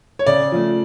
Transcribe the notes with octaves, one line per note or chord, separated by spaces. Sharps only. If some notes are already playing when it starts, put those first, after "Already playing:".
C#5
C#3 D5
F3 A3